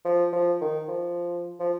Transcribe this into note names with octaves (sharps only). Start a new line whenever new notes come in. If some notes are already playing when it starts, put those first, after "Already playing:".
F3
F3
D#3
F3
F3